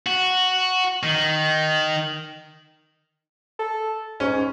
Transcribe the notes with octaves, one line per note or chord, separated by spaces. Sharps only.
F#4
D#3
A4
G#2 C#4